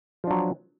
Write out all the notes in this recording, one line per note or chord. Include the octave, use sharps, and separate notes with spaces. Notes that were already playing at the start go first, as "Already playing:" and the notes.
F3 F#3 D4